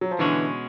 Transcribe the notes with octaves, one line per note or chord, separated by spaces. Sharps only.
F#3
F3
B2 D3 E3 G#3 C#4 F#4